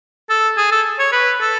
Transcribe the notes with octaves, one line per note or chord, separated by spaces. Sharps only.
A4
G#4
A4
C#5
B4
A4